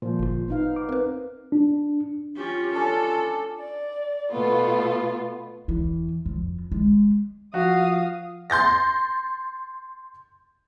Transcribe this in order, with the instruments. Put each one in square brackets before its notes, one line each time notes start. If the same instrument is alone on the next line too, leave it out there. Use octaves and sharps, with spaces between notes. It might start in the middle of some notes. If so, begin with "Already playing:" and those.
[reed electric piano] A#2 F3 [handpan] C5
[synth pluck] G1 F4
[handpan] B3 D#4 F5
[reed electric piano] D6
[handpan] C4 [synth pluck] A#4 B4
[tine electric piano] D4
[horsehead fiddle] C#4 G4 [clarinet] F4
[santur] C#4 D4 [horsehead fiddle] A4
[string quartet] D5
B2 A3 B3 F4
[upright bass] E2 E3
F2
G#3
[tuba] F3 [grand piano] F#4 [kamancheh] F5 D#6
[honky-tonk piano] C6 G6 A6 A#6